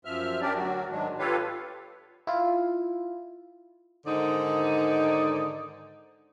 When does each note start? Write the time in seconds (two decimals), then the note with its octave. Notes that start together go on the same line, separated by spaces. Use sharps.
0.05 F#2 F3 E5 F6
0.41 C#4 D4 G4 A#4 D5
0.55 D2 F#3 F#4
0.90 G#2 D#3 F#3 G#3 D4
1.19 F4 G4 A4 B4 C#5 F5
2.27 E4 F4
4.06 G#2 D3 D#3 D#4 C5 D5